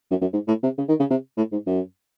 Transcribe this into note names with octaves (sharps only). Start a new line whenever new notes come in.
F#2
F#2
G#2
A2
C3
C#3
D#3
C#3
C3
A2
G#2
F#2